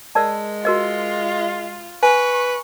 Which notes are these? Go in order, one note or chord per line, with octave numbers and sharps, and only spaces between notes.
G#3 A#4 D5 A5
F4 F#4 A#4 D#5
B4 G#5 C#6